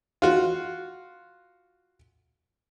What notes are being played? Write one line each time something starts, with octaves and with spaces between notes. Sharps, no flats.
F4 F#4